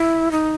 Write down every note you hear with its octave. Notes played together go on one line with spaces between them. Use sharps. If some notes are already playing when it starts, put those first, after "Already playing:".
Already playing: E4
D#4